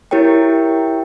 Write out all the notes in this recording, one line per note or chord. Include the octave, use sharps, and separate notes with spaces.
E4 G4 A#4 C#5 G5